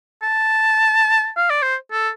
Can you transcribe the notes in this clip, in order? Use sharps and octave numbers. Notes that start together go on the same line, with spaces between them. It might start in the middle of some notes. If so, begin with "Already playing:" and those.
A5
F5
D5
C5
A4